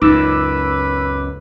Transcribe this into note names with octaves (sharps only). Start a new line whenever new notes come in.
C#2 F#2 D#4 B4 D6 E6